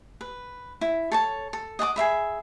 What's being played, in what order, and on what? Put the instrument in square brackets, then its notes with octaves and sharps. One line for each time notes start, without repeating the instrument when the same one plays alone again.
[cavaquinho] B4
E4
A4 C#5 A5
A4
D#5 F#5 A5 D6
G#4 A#4 E5 B5